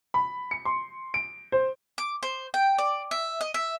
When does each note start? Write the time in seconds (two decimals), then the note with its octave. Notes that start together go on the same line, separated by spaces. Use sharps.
0.14 B5
0.51 C#7
0.65 C6
1.14 D7
1.52 C5
1.98 D6
2.23 C5
2.54 G5
2.78 D5
3.11 E5
3.41 D#5
3.54 E5